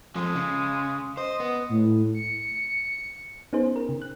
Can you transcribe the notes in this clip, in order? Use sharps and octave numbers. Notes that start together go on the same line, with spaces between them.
F2 F3 G#3
C#3
C5 D#5
B3
A2
C#7
B3 C#4 D#4 G#4 C5
A#4
C#3
F#6